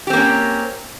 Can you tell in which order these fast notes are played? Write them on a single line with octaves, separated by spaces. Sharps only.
G4 C4 A#3 C#4